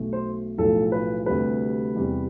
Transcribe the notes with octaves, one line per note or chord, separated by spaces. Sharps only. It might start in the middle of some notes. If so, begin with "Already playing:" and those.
Already playing: B1 B2 A3
C5
B1 A2 F3 A3 A4
B4
D2 C3 G3 B4
E2 C3 G3